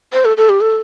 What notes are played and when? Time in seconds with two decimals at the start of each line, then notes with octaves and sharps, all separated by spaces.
0.13 C5
0.25 A4
0.37 A4
0.49 G4
0.61 A4